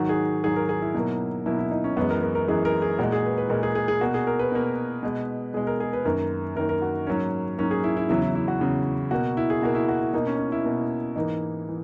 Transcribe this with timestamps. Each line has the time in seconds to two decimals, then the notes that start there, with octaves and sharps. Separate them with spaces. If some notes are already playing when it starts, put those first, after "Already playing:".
Already playing: G#2 D#3 F#3 F#4
0.09 G#4
0.44 G#2 D#3 F#3 G#4
0.56 A#4
0.69 G#4
0.82 E4
0.94 B2 F#3 A#3
1.46 B2 F#3 A#3 E4
1.59 E4
1.71 D#4
1.84 C#4
1.97 F#2 E3 G#3 B3
2.10 A#4
2.23 A#4
2.35 A#4
2.48 F#2 E3 G#3 G#4
2.65 A#4
2.82 G#4
2.99 A#2 F#4
3.03 G#3
3.12 G#4
3.25 B4
3.38 B4
3.50 A#2 G#3 A#4
3.63 G#4
3.75 G#4
3.88 G#4
4.01 B2 A#3 F#4
4.14 G#4
4.27 A#4
4.39 B4
4.52 B2 A#3
5.03 B2 G#3
5.54 B2 G#3 G#4
5.67 A#4
5.80 G#4
5.93 B4
6.05 F#2 D#3 A#3 A#4
6.56 F#2 D#3 A#3 A#4
6.69 A#4
6.82 F#4
7.07 G#2 F#3 A#3 C#4
7.58 G#2 F#3 A#3 C#4
7.71 G#4
7.84 E4
7.97 E4
8.09 E2 C#3 F#3 E4
8.22 E4
8.35 E4
8.48 F#4
8.60 E2 C#3 F#3
9.11 B2 A#3 F#4
9.37 E4
9.50 G#4
9.62 B2 A#3 F#4
9.75 E4
9.89 F#4
10.01 E4
10.13 B2 A#3 D#4
10.27 C#4
10.38 C#4
10.52 E4
10.64 B2 A#3
11.16 G#2 E3 A#3 D#4
11.69 E3